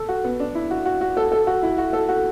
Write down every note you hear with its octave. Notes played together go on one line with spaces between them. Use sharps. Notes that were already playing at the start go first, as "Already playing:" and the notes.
Already playing: A4
F#4
B3
D4
E4
F#4
F#4
F#4
A4
A4
F#4
E4
F#4
A4
F#4